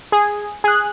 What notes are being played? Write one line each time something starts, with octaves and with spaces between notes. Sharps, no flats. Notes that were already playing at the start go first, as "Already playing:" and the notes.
G#4
G#4 F#6